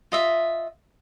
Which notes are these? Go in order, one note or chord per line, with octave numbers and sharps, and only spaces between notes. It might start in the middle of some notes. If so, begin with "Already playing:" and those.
F4 D#5 E5